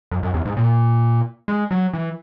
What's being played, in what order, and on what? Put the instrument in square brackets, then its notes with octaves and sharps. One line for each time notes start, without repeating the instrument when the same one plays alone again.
[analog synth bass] F#2
F#2
E2
G#2
A#2
G#3
F#3
E3